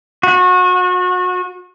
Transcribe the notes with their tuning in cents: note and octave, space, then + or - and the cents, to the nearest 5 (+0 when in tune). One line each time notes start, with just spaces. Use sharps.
F#4 -30